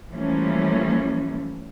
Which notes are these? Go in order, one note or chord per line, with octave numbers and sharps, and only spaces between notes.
E3 F3 G3 A3 A#3 C#4